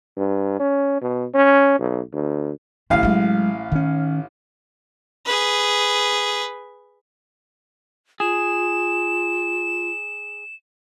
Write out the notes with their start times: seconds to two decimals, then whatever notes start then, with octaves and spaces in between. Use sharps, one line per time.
0.17 G2
0.59 C#4
1.02 B2
1.34 C#4
1.79 B1
2.13 D2
2.90 A1 D#3 F3 F5
3.03 F#3 G#3
3.72 D#3 C#4 D#4
5.26 G#4 B4
8.20 F4 G#4 E7